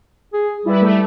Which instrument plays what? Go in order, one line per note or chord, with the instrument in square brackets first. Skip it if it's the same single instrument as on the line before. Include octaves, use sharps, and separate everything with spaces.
[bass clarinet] G#4
[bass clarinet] G3 [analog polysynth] E4 B4
[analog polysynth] A3